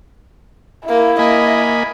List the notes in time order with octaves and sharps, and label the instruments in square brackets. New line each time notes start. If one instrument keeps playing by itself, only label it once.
[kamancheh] A#3 [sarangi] E4
[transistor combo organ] A#3 G#5 B5 [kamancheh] D#5